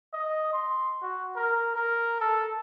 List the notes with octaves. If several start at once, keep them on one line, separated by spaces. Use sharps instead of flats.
D#5
C6
F#4
A#4
A#4
A4